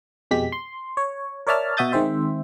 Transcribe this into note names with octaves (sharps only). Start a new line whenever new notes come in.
F2 B2 G#3 G4 B6
C6
C#5
A#4 C#5 D5 E5 A5 F6
B2 F#4 E5 D#6 G6 A6
D#3 G#3 C4 C5 E5